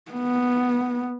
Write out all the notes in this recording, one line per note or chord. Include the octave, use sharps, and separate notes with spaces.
B3